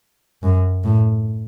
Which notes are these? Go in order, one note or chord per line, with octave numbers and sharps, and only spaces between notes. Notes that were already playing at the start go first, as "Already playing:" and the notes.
F#2
A2